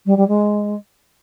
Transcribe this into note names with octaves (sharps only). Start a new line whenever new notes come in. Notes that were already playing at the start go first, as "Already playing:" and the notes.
G3
G3
G#3